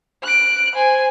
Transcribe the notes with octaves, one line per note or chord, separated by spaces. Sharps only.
F#6 D7
C5 G#5